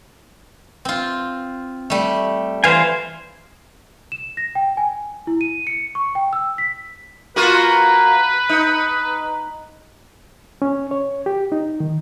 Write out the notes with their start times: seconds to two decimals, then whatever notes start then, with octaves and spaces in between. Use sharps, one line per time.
0.85 C4 F4
1.90 G3 A3
2.64 E3 C5 F5 G#5
4.12 E7
4.37 A#6
4.55 G5
4.77 G#5
5.27 E4
5.41 D#7
5.67 C#7
5.95 C#6
6.15 G5
6.33 E6
6.58 B6
7.36 A#3 F4 F#4 B4
8.49 D#4
10.62 C#4
10.91 C#5
11.26 G4
11.52 D#4
11.80 D#3